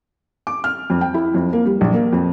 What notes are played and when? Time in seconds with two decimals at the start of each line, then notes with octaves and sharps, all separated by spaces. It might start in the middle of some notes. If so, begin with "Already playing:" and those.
0.47 D6
0.64 F6
0.90 F2
1.01 G5
1.14 E4
1.34 F2
1.53 A#3
1.66 G3
1.81 A#1
1.94 A#3
2.13 F2